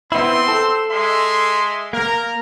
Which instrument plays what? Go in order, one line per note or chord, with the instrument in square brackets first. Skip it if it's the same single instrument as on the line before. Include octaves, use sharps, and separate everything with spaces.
[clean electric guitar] B3 E4 [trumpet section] C4 C6
[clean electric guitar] A4
[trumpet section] G#3 E5 C6
[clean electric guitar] A#3 [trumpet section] A#4